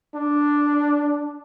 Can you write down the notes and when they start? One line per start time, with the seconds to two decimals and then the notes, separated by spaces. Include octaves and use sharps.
0.15 D4